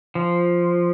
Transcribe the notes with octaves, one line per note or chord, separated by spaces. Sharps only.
F3